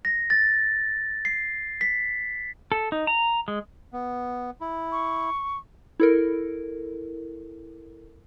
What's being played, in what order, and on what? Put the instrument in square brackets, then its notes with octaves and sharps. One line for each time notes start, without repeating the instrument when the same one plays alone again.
[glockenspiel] A#6
A6
C7
B6
[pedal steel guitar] A4
D#4
A#5
G#3
[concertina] B3
E4
[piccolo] C#6
[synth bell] E4 A4 A#4